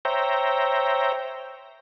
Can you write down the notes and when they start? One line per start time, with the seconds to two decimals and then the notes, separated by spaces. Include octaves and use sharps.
0.05 C5 C#5 E5 G5 A#5